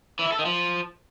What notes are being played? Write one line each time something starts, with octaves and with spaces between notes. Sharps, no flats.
E3
E4
A4
D#3
F3